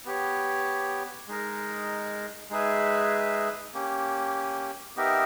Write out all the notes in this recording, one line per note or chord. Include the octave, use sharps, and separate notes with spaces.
B3 G4 C#5
G#3 D#4 A#4
G#3 D#4 G#4 B4 E5
A#3 C#4 G4
B3 D#4 G4 A#4 E5